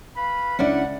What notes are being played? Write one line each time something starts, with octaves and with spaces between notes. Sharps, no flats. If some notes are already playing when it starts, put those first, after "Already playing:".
B4 F5 B5
C#2 C#4 D4 E4 D5 F#5